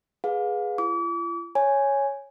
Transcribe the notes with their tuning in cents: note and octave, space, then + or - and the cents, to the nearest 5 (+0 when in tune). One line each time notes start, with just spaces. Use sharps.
G#4 +0 B4 -5 F5 +35
F4 -45 D6 -40
C#5 +0 G#5 +0